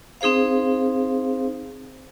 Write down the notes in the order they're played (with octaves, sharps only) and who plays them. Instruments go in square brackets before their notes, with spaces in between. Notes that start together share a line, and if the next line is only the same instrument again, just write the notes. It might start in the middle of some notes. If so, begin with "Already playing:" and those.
[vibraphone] C4 D#4 G#4 C5 F5